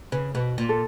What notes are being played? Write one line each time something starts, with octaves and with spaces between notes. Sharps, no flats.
C#3 B4
B2 B4
A#2
A4